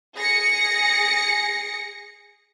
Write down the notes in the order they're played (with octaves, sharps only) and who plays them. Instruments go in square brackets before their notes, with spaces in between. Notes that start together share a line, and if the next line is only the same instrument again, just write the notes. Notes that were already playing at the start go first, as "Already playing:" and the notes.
[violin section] G#4 A#6 C#7